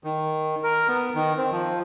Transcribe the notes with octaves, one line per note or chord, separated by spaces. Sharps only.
D#3
A#4
B3
D#3
C4
F3